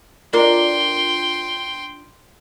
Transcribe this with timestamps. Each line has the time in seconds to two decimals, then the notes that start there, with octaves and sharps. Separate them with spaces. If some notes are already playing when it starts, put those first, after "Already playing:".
0.33 D4 F4 A#4 G5 C6